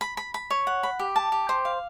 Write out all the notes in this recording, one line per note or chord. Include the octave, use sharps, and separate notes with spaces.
B5
B5
B5
C#5
F#5
B5
G4
A5
G4
C5
F5